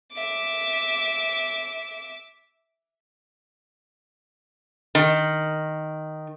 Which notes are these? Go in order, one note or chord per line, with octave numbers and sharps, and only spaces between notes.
E5 D6
D#3